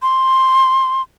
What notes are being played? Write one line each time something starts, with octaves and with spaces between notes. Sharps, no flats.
C6